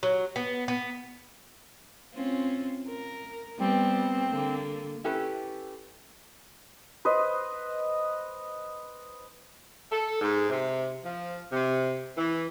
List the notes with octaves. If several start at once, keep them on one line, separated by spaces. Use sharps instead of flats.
F#3
B3
B3
C4 C#4 F4
A#4
G3 B3 C4
D3 A#3
C#4 E4 G4 A4 B4
B4 C5 D#5
A4
G#2
C3
F3
C3
E3